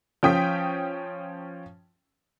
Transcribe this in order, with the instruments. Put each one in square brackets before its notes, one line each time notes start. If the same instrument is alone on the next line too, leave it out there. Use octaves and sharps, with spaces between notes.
[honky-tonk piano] F3 C#4 G5 D#6 B6